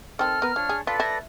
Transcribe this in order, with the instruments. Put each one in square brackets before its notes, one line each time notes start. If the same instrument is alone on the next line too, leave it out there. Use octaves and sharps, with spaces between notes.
[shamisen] D#3 C4 [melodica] A4 [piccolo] F6
[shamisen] B3 B4 [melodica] A#4
[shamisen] F3 [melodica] D4 C#5
[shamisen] G#4
[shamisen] F4 [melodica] A4 B4 D5 [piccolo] B6
[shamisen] E4 [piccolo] A#6